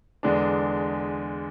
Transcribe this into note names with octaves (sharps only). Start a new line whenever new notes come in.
E2 D3 G#3 D4